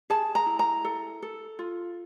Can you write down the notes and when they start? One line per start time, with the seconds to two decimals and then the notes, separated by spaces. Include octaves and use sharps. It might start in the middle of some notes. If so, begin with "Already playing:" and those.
0.10 G#4 A5
0.35 A#5
0.46 E4
0.59 A#5
0.84 A4
1.22 A4
1.59 F4